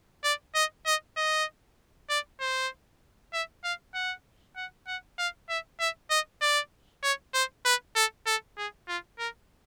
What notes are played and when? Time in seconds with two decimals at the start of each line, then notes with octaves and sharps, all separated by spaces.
0.24 D5
0.55 D#5
0.86 D#5
1.17 D#5
2.09 D5
2.40 C5
3.33 E5
3.64 F5
3.94 F#5
4.56 F#5
4.87 F#5
5.18 F5
5.49 E5
5.80 E5
6.10 D#5
6.41 D5
7.03 C#5
7.34 C5
7.65 B4
7.96 A4
8.26 A4
8.57 G#4
8.88 F4
9.19 A#4